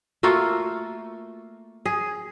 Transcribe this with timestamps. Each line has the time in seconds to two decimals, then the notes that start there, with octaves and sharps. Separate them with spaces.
0.23 A3 A#3 F4 F#4
1.85 G#4